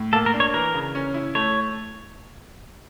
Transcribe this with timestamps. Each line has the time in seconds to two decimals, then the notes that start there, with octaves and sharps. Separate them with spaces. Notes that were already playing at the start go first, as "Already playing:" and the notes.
Already playing: A2
0.13 A#3 A4
0.26 A#4
0.34 D4
0.40 C#5
0.54 E3 A#4
0.74 C#3
0.95 C#4
1.14 E4
1.35 A3 C#5